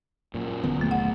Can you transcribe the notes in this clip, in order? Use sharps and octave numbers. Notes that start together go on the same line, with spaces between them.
F#2 A#2
D#1 D3 B3
B1 B2 A3
F#5